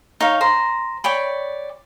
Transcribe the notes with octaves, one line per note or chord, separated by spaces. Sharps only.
D#4 C#5 F5
C5 A#5
C#5 D5 G5 B5